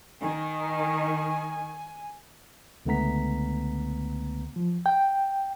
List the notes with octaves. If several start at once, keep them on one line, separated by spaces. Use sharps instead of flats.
D#3 G#5
C#2 D3 A3 B3 A#5 B6
F3
G5